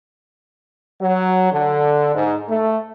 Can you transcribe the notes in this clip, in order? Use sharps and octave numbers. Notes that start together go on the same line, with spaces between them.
F#3
D3
G#2
A3